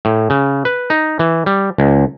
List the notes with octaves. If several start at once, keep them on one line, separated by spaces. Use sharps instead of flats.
A2
C#3
B4
D#4
E3
G3
C#2